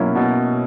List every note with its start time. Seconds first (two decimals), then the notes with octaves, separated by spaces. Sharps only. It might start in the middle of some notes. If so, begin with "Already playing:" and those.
Already playing: B2 F#3 A#3 C#4 E4
0.15 B2